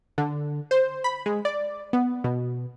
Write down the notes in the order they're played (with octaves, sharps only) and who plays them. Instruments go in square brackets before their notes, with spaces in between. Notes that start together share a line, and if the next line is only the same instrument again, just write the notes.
[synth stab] D3
C5
B5
G#3
D5
B3
B2